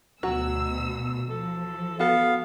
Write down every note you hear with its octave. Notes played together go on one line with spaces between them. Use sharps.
D2 B2 F#3 F#4 E6
F3 A4
B3 F#4 A4 F5